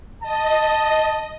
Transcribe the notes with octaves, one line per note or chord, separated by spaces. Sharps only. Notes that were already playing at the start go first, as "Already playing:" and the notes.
D#5 A5